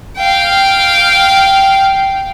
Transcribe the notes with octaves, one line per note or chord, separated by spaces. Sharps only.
F5 G5